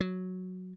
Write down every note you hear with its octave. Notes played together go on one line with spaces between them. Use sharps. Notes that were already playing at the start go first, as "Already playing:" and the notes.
F#3